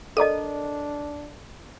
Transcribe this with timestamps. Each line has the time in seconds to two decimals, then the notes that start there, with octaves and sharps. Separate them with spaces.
0.17 D4 A4 A#4 D5 D#5 D#7